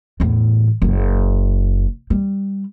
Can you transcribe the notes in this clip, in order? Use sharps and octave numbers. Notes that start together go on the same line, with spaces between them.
E2 A2
F#1 F#3
G3